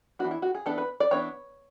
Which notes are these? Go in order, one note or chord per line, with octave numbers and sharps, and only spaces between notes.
E3 B3 D4 F#4
E4
F#4
G#4
E3 B3 D4 A4
B4
D5
E3 B3 D4 C#5